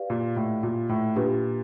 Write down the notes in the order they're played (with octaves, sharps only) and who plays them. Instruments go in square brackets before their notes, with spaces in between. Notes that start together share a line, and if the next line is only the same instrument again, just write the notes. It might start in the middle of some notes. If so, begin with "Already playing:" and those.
Already playing: [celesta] G4 B4 D5 F5
[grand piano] A#2
A2
A#2
A2
[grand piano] A#2 [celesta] D4 G4 B4